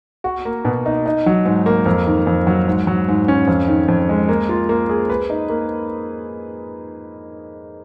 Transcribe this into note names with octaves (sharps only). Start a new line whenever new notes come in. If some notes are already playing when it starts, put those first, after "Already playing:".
F#4
A#3
B2
D#4
D#4
F#3
G#2
A#3
F2
D#3
F2
F#3
G#2
F#3
G#2
C#4
F2
D#3
F2
G#3
A#3
F4
A#3
G#4
B4
D#4
A#3